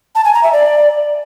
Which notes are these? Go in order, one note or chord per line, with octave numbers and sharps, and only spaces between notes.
A5
G#5
A#5
E5
D5